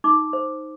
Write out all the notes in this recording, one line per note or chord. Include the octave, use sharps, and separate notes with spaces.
D#4 D6
C5